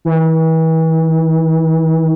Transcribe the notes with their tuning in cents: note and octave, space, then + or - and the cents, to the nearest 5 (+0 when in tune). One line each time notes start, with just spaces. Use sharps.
E3 -35